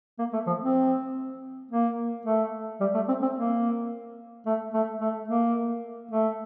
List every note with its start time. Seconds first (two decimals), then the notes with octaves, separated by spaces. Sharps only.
0.19 A#3
0.33 A3
0.47 F3
0.61 C4
1.71 A#3
2.26 A3
2.81 G3
2.94 A3
3.08 C4
3.22 C4
3.35 A#3
4.46 A3
4.74 A3
5.01 A3
5.28 A#3
6.11 A3